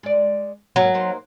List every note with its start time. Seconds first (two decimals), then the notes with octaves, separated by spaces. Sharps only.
0.03 G#3 D5
0.76 G#2 F#3 A#3
0.94 A#3 D#4 C5